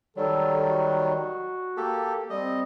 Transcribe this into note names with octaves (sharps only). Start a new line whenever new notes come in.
D#3 F#3 G3 A4
F#4
A#3 G4 A4
G3 C4 D#5